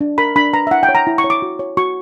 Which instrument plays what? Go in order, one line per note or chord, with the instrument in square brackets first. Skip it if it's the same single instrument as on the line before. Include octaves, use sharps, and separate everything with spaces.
[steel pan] D4
A#4 B5
D4 B5
B4 A#5
E5
E4 F#5
G5
C#5
A#5
E4
C#6
C#5
D6
F#4
C#5
F#4 C#6